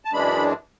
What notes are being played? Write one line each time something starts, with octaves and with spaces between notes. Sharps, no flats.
A5
F#2 E3 G#3 D4 B5